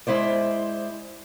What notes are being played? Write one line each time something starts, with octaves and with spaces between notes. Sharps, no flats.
G#3 E4 C5 D5